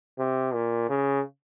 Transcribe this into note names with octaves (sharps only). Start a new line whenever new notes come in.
C3
A#2
C#3